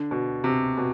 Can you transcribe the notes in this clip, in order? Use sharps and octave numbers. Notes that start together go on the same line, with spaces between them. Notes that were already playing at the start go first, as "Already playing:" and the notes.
Already playing: D3
B2
C3
B2